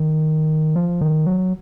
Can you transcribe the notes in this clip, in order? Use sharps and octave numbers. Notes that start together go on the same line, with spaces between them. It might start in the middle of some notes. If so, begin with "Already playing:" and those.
Already playing: D#3
F3
D#3
F#3